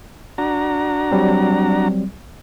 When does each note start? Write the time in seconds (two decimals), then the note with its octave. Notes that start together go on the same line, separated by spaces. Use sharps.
0.38 D4 F#4 A#5
1.12 F#3 G3 C4